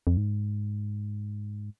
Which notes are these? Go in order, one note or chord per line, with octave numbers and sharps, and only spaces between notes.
F2
G#2